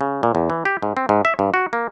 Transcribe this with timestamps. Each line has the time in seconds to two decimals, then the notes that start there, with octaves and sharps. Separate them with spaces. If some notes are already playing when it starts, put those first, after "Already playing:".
0.01 C#3
0.23 A#2
0.35 E2
0.50 E3
0.65 G4
0.82 G#2
0.97 C4
1.09 G#2
1.25 E5
1.39 G2
1.54 F#4
1.73 A#3